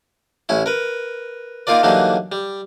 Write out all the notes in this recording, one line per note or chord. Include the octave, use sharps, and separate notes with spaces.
A1 C#4 E4
A#4 B4
A#3 D#4 F4 A#4 D5
D3 E3 F#3 G3 A#3 D#4
G3